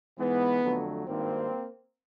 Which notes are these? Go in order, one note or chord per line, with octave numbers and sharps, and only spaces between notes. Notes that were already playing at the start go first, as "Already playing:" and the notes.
G#2 E3 G#3 B3
F2 D3 F#3 A3
G#1 G2 D#3 A#3 C4